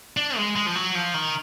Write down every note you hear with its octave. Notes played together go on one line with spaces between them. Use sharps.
D4
G#3
G#3
F3
F#3
F3
D#3